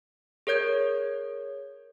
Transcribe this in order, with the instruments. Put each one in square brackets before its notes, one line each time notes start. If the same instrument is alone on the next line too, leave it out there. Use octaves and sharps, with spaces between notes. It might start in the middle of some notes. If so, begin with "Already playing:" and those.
[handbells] G#4 A#4 C#5 G6 G#6